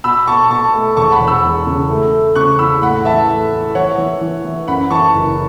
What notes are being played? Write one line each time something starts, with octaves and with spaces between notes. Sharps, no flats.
B2 B5 E6
B2 A5 C#6
B2 A5 C#6
A3
E1 A5 C#6
F#5 B5
E1
B5 E6
E2
C#3
A3
A3
C#3 C#6 F#6
E2 B5 E6
A2 F#5 B5
E3 E5 A5
A3
E3
E3 C#5 F#5
E3
E3
E3
F#2 F#5 B5
E3 A5 C#6
F#1